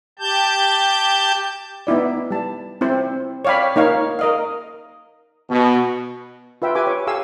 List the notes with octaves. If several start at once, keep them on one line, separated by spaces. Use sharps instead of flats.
G4 A5 G6
B3 D#4 E4 D5
G3 A5
C4 E4 C5
C#5 D5 F5 G5 B5
A#3 D#4 C#5 F5
A#4 D#5 F5
B2
F4 B4 E5 G5
G4 B4 G#5 D6
C#5
G4 A4 F5 G#5 E6